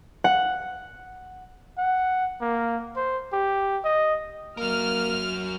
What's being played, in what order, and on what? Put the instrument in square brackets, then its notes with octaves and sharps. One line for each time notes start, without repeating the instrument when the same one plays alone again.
[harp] F#5
[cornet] F#5
A#3
C5
G4
D#5
[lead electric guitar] F#3 A#4 [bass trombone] A#3 [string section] F6